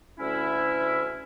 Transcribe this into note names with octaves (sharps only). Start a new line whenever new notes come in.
D2 C#4 E4